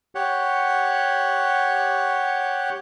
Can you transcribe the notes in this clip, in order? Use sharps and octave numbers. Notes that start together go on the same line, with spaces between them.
G4 C#5 F#5